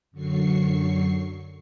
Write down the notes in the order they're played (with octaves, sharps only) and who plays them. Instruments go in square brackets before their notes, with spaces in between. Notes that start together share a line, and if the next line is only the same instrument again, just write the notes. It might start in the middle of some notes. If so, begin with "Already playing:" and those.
[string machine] F#2 D3 F#3 C#6 C7